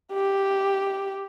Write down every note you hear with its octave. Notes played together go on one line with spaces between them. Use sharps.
G4